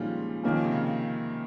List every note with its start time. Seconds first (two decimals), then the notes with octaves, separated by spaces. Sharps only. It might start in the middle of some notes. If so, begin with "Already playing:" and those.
Already playing: A#2 D#3 F3 G3 G#3 C#4 F4
0.43 D#3 F3 A#3 C#4
0.64 C3
0.71 C#3